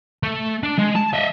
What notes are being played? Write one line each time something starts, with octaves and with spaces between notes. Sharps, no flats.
A3
D4
G#3
A5
D#5 E5